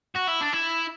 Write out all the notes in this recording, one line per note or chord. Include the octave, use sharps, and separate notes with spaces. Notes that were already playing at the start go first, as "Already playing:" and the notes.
F#4
E4
D4
E4